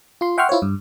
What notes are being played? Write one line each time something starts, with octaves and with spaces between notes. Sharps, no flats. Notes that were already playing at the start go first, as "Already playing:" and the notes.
F4 C6
E5 F#5 G5 C6 C#6 F6
E4 F4 C5 C#5
G2